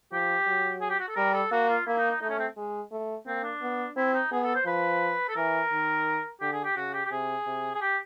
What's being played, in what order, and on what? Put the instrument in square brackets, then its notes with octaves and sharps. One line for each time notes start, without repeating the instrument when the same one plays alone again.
[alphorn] F3 [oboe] G4
[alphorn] F#3
[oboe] G#4
G4
F#4
A4
[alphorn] G3 [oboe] A#4
[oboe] A4
[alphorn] A#3 [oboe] F#4
[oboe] F4
[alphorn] A#3 [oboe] E4
[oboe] D#4
D#4
[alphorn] A3 [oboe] D#4
[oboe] C#4
C4
[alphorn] G#3
A3
[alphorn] A#3 [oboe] C4
[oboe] D4
[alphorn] B3
[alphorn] C4 [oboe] E4
[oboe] D#4
[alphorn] B3 [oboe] G#4
[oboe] A4
C5
[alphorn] F3 [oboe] B4
[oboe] A4
[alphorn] E3 [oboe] A#4
[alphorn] D#3
[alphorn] D3 [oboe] G4
[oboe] G#4
G4
[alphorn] C#3 [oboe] F#4
[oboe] G4
G4
[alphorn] C3 [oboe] G#4
[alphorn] C3
[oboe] G#4
G4